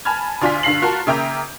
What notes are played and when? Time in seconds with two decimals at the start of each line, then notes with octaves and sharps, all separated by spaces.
0.05 G#5 A5 B5 F6 G#6
0.42 D2 D4 F4 G#5 C6 B6
0.63 G2 D3 F5 B6 C7 F#7
0.82 F4 F#4 A#4 A5
1.07 C#3 A#3 E5 G5 A#5 G6